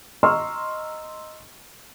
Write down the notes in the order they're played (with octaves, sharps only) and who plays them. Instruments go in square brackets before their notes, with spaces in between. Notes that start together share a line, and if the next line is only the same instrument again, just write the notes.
[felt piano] D#5 A#5 C6 C#6 E6 F6